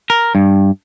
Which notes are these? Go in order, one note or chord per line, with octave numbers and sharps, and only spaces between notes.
A#4
G2